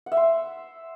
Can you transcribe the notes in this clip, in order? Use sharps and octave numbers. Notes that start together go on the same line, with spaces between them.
F#5
E5
C6